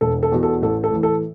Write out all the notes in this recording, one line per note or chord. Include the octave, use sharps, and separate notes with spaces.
E1 A4
A4
E2 B2
A4
A1 A4
A4
A2 E3
A4